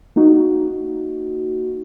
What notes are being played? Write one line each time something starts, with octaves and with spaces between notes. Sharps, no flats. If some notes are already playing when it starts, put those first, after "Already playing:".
A#3 D#4 F#4